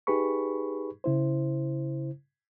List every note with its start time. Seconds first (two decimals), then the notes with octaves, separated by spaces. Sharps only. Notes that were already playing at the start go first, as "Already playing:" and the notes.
0.07 D#4 G4 G#4 B4 B5 C#6
1.04 C#3 E4 C5